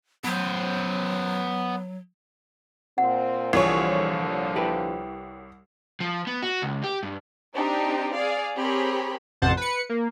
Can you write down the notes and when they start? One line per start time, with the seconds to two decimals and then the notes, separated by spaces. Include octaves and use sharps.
0.25 F#3 B3 C5
2.98 A#2 C4 F#5
3.53 C2 A#2 D3 E3 F3 F4 G#4 C#5
4.55 E4 G4 B4
6.00 F3
6.27 B3
6.42 F#4
6.62 C#2
6.84 G4
7.03 G2
7.54 C4 D4 D#4 G4
8.14 G#4 D5 F5
8.57 C4 G4 G#4 A#4 C#5 B5
9.42 A1 F2 C3 C5 F#5 A5
9.57 B4 C#7
9.89 A#3